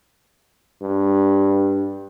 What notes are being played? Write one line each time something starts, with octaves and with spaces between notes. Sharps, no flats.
G2